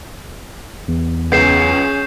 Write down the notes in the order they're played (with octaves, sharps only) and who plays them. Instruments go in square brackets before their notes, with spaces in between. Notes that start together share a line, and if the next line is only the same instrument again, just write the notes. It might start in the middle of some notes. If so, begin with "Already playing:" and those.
[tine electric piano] E2
[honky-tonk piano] C#2 F#2 B3 [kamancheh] C#4 G#4 [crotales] G6 C7 E7